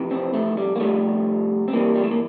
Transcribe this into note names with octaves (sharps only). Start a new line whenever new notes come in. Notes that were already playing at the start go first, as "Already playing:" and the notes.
Already playing: F2 C3 E3
C4
A3
G3
A#3
F2 C3 E3 G3 A3
C4
G2 E3 G3 A#3
G3
A3
A#3